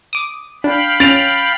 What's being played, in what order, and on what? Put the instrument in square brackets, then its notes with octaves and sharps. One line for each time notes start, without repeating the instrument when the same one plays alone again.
[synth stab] D6 D#6
[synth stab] D4 [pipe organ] F5 G5 B5
[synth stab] C#4 [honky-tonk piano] A6 D7 F7